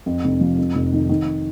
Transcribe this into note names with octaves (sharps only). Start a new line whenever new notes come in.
F2
F1
F3
F2
F1
D#3
D#3